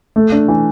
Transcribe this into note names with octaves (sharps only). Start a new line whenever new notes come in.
A3
D4
E3